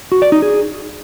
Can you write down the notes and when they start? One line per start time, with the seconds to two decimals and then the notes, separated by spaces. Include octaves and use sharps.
0.12 F#4
0.22 D5
0.32 D#4
0.42 G#4